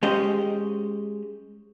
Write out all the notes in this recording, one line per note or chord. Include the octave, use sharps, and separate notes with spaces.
G#3 C#4 G4 C5 D#5